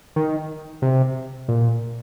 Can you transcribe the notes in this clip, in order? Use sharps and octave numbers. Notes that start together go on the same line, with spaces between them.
D#3
C3
A#2